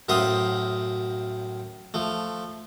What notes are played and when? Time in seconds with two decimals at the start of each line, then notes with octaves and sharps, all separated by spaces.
0.09 F#2 A2 C5 E5 F5 D#6
1.94 F3 A3